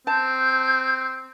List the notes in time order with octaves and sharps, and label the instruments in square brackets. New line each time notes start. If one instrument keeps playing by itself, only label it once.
[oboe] C4 [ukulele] A5 [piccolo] G6